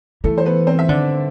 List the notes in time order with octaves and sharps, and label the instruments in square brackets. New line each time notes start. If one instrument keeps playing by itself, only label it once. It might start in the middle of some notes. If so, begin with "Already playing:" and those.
[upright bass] E3 [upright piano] A3 A4
[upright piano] C5
B3 B4
C4 C5
E5
[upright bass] D3 [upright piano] D4 D5